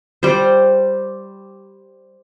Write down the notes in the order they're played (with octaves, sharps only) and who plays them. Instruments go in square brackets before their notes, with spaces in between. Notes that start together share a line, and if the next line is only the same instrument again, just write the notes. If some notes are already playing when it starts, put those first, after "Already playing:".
[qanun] G3 C5